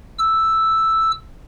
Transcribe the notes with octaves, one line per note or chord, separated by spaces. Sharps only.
E6